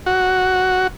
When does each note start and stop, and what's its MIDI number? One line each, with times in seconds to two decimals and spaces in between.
0.06 0.87 66